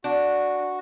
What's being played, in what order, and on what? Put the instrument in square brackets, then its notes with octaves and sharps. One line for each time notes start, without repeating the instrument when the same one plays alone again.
[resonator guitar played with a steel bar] D4 [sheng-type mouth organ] F#4